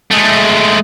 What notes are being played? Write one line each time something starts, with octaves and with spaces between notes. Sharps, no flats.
G#3 A3